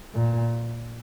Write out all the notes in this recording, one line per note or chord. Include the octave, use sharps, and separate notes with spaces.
A#2